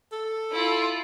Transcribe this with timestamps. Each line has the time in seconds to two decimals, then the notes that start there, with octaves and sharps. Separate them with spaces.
0.12 A4
0.52 E4 F4